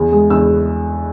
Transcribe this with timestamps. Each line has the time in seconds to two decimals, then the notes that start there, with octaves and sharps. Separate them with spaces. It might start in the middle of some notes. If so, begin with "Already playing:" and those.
Already playing: E2
0.12 G#3
0.30 E2 E6